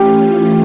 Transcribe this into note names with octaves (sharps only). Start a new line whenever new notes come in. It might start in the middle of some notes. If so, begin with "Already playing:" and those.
Already playing: E3 A3 C#4 F4 G4